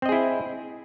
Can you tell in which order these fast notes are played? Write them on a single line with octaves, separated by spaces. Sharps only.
C4 D#5 G#4 E4